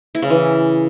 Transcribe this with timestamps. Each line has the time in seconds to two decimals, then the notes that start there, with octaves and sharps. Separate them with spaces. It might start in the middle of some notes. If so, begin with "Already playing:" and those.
0.15 E4
0.22 C#3
0.30 E3